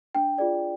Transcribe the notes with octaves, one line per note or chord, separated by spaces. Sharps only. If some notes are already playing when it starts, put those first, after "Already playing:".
D4 G5
F4 G#4 D5